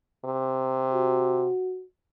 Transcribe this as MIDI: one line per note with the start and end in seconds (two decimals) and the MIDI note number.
0.25 1.48 48
0.94 1.84 66